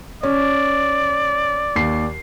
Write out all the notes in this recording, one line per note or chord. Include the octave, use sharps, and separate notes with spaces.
C#4 D5
D#2 C7